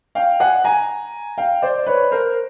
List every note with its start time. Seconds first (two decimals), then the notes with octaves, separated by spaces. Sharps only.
0.15 F5 G5
0.40 F#5 G#5
0.64 G#5 A#5
1.38 F5 G5
1.62 C5 D5
1.86 B4 C#5
2.11 A#4 C5